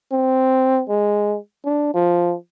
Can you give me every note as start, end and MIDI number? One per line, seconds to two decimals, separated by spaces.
0.12 0.83 60
0.89 1.37 56
1.64 1.92 62
1.94 2.34 53